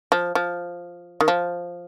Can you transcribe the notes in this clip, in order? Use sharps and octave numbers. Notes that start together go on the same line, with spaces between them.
F3
F3
D#3
F3